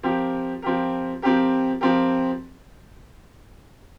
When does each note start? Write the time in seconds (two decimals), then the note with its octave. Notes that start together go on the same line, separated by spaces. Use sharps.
0.03 F3 C4 G4 A#4
0.62 F3 C4 G4 A#4
1.22 F3 C4 G4 A#4
1.81 F3 C4 G4 A#4